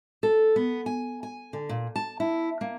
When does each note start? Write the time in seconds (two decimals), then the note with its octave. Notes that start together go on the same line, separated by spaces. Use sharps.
0.23 A4
0.56 B3
0.86 G#5
1.23 G#5
1.53 D3
1.69 A#2
1.96 A5
2.20 E4
2.61 A#3